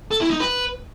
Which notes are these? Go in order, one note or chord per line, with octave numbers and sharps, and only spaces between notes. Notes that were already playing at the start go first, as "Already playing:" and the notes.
A4
E4
D#4
B4